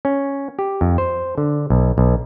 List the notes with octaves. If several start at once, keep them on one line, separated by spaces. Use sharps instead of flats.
C#4
G4
F2
C5
D3
B1
B1